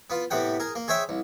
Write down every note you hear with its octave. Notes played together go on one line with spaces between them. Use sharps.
B3 F4
A2 C3 B3 F#5 G5
G#4 A#4
A#3
G#4 C5 C#5 E5 G5
C2